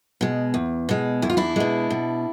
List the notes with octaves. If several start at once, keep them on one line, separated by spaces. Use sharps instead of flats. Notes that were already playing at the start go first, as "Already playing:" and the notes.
B2 G#3
E2
B2 G#3
E2 E4
F4
D4 E4
B2 G#3
B2